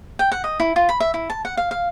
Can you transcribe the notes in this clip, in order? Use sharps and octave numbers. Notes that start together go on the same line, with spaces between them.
G5
F#5
D#5
E4
F4
B5
E5
E4
A5
F#5
F5
F5